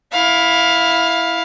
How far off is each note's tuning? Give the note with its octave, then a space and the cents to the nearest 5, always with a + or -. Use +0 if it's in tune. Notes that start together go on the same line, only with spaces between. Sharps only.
E4 +0 F5 +15